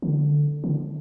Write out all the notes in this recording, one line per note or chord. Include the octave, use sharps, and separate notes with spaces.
D3
D3